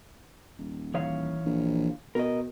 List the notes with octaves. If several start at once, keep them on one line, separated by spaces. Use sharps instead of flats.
D#1
E3 C#5 F5
A#1
B2 A#4 D#5